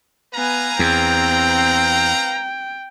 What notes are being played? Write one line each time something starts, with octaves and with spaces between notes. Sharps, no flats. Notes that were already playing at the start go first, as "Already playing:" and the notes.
B3 B4 F5 G#5 A#5
E2 C4 G5